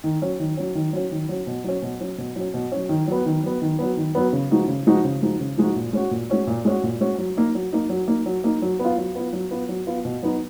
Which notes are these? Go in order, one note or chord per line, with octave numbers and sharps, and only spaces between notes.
D#3
F#3 C#4
D#3
F#3 C#4
D#3
F#3 C#4
D#3
F#3 C#4
B2
F#3 C#4
B2
F#3 C#4
B2
F#3 C#4
B2
F#3 C#4
D#3
F#3 B3
D#3
F#3 B3
D#3
F#3 B3
D#3
F#3 B3
C#3
F3 G#3 D#4 F#4
C#3
F3 G#3 D#4 F#4
C#3
F3 G#3 D#4 F#4
C#3
F3 G#3 D#4 F#4
A#2
G#3 C#4 F#4
A#2
G#3 C#4 F#4
A#2
G#3 C#4 F#4
A#2
G#3 C#4 F#4
F#3
A#3 D#4
F#3
A#3 D#4
F#3
A#3 D#4
F#3
A#3 D#4
F#3
B3
F4
F#3
B3 F4
F#3
B3 F4
F#3
B3 F4
B2
F#3 B3 D#4 F#4